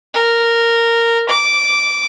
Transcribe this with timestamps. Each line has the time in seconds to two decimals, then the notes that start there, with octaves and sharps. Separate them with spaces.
0.14 A#4
1.29 D6